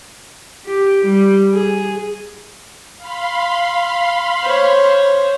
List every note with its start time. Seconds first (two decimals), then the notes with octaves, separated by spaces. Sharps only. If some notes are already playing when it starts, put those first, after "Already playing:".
0.66 G4
1.05 G3
1.52 G#4
2.97 F5 B5 C6
4.43 C5 C#5